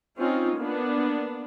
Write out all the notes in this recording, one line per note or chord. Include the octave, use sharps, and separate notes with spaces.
C4 C#4 D#4 F4
A#3 B3 D4